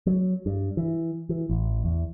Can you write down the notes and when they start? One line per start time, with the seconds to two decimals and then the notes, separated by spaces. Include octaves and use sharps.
0.07 F#3
0.46 G2
0.77 E3
1.29 E3
1.50 A1
1.85 E2